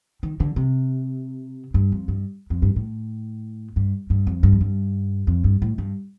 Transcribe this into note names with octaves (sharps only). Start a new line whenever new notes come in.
D#3
D3
C3
G2
F2
G2
F2
G2
A2
G2
G2
F2
G2
F2
G2
F2
G2
A2
G2